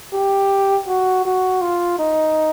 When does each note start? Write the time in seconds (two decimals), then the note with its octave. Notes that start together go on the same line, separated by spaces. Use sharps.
0.13 G4
0.88 F#4
1.25 F#4
1.61 F4
1.99 D#4